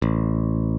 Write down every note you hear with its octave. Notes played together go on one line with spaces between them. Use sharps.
A1